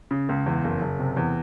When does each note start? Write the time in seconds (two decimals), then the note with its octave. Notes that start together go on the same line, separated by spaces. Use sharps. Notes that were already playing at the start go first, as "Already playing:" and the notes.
0.11 C#3
0.29 C#2
0.46 E2
0.64 F#1
0.81 F#1
0.99 C3
1.17 E2